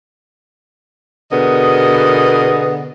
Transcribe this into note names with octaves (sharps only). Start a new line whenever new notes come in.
B2 D3 B3 G#4 A#4 D#5